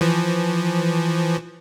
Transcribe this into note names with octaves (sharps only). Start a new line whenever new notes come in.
E3 F3